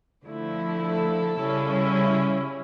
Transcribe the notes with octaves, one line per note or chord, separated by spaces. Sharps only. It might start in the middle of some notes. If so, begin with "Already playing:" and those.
D3 F3 A3 E4
A4
C#3 G3 C#4 E4